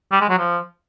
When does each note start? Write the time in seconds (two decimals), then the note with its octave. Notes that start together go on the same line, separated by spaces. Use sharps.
0.12 G3
0.21 G#3
0.29 F#3
0.38 F3